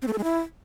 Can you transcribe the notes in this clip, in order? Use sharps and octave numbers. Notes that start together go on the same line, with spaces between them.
C4
A3
A4
G#3
E4